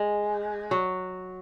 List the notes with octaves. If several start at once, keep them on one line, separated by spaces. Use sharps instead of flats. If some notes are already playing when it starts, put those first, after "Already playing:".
Already playing: G#3
F#3